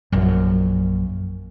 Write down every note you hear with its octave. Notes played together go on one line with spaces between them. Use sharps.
A#1 F#2